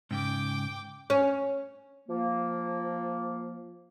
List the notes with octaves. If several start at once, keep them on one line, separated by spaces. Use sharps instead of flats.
G#2 C#3 G5 D6
C#4
F3 A#3